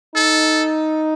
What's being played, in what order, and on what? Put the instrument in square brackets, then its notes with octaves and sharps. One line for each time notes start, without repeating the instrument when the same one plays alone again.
[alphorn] D#4 [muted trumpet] A4